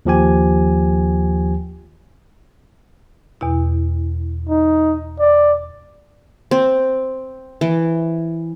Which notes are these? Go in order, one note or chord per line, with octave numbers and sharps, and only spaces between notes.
D#2 F3 G4 G#5
E2 B2 E4
D#4
D5
C4
E3